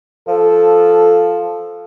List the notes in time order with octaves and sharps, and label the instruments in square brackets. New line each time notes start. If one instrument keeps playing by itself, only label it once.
[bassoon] F3 [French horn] A4